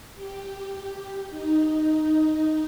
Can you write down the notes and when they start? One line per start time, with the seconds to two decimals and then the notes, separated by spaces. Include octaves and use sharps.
0.15 G4
1.30 D#4